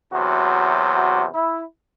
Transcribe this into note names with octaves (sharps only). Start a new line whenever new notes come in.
E2 C3 F#3 F#4
F#4
E4